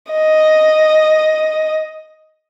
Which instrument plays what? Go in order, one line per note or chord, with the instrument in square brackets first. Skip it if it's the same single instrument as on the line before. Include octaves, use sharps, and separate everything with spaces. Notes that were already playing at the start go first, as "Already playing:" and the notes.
[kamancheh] D#5